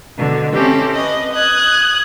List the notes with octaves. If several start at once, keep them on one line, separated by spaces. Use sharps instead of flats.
B2 D3
C4 C#4 E4 G4 A4
B4 D#5
D#6 F#6 G#6